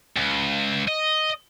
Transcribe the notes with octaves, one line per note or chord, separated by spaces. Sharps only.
C#2
D#5